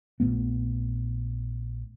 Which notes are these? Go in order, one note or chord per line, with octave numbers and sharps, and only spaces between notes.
A#1 A#2 A3 B3